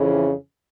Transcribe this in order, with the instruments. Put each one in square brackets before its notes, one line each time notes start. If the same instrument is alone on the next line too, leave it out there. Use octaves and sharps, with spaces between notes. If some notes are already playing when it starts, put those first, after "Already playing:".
Already playing: [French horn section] F2 C#3 E3